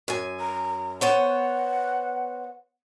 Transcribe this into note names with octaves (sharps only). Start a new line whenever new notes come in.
F#2 G#5
A#5
B3 C5 C#5 F#5